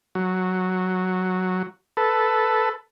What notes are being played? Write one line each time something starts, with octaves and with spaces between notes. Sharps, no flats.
F#3
A4 B4